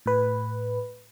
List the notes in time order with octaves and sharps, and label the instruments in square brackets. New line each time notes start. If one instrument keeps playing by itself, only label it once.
[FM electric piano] A2 B4